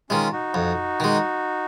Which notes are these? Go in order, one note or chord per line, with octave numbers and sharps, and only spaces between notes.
D#3 G#3 C#4 F4
D#4 F#4
F2
D#3 G#3